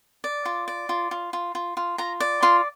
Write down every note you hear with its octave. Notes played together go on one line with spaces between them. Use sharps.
D5
F4
D5
F4
F4
F4
F4
F4
F4 A#5
D5
F4 C6